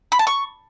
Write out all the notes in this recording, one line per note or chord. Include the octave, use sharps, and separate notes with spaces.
B5
A5
C#6